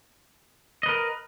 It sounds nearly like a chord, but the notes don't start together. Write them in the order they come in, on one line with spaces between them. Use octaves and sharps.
D#5 B4 A#4